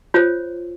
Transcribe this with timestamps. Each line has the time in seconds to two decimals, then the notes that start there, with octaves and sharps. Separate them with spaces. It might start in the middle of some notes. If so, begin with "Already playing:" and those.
0.14 F4 C5 C#5